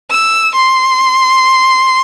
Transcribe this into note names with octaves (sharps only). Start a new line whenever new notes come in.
E6
C6